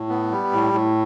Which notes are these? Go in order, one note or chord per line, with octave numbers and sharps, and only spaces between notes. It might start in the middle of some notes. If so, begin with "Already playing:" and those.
Already playing: A2
B3
G3
A2
A2